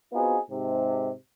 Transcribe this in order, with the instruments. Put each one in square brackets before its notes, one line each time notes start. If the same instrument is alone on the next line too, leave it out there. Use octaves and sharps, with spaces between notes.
[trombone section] B3 C4 D#4 F4 F#4 G#4
G#2 C3